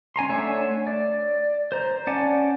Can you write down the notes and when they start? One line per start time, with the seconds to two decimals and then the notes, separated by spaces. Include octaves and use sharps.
0.16 C#4 G#5 A#5 C6
0.29 A3 D4 C#5 E5 F#5
0.87 D5
1.72 C5 A#5
2.07 C#4 D5 F#5 G#5 A5